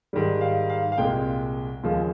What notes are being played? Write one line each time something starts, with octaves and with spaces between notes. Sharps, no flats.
G#2 D#3 G3
F5
F5
F5
C2 A#2 G#3 G5
D#2 C#3 F3 G#3